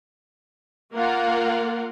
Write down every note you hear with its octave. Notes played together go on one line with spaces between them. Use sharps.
A#3 F4 A#4 F#5